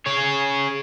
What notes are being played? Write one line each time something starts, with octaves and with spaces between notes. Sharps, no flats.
G#4 C#5